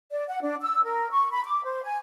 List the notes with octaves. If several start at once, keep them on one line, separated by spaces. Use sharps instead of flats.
D5
F#5
D4
E6
A#4
C#6
B5
D6
C5
G#5